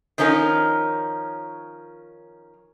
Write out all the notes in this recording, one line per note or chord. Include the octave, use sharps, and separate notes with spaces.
D#3 F3 C#4 D#4 A#4